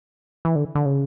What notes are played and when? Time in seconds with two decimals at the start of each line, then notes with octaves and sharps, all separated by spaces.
0.45 E3
0.56 D3
0.75 D3
0.85 C#3